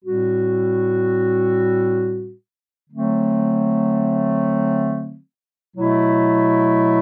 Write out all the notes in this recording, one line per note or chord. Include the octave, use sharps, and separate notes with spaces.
A2 G3 C4 F#4
D3 F#3 A3 C4
B2 F#3 A3 E4